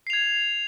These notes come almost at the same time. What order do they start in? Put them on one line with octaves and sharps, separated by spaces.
C7 F7 G#6